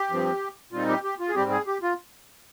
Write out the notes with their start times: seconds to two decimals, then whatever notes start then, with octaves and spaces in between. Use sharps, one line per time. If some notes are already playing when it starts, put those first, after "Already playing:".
Already playing: G4
0.10 G2 F3 C4
0.72 A#2 G3 C4 D#4 F4
0.88 G4
1.04 G4
1.20 F4
1.29 G#4
1.35 G#2 G3 C4 G4
1.51 G#4
1.67 G4
1.82 F4